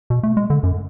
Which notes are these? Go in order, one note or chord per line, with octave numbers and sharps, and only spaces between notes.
B2
A3
G#3
D3
F#2